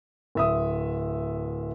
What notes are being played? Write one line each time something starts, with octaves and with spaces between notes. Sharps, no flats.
D1 E5 D#6